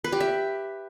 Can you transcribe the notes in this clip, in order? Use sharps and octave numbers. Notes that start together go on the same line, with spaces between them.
B4
G4
E5